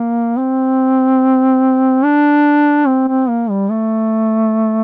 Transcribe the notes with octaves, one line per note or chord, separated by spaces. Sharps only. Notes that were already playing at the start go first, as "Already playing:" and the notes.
Already playing: A#3
C4
D4
C4
C4
A#3
G3
A3